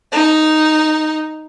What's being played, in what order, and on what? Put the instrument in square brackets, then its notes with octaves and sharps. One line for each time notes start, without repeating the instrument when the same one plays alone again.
[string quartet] D#4